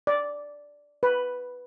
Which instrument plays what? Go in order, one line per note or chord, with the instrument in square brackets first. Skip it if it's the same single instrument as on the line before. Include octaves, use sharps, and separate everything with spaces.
[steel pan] D5
B4